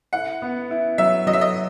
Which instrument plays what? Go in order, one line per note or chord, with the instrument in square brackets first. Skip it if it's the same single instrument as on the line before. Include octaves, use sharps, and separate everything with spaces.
[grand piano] E4 [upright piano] F#5
[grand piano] B3
E4
[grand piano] F#3 [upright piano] E5
[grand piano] F#3 [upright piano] D#5
[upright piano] E5
D#5